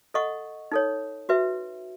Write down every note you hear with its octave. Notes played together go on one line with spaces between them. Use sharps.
A4 D#5 F#5 C#6
D#4 A4 C#5
F#4 B4 E5